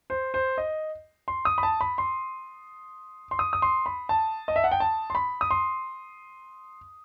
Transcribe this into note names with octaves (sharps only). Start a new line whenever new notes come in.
C5
C5
D#5
C6
D#6
B5
A5
B5
C6
C6
D#6
D#6
C6
B5
A5
D#5
E5
F#5
G5
A5
C6
B5
D#6
C6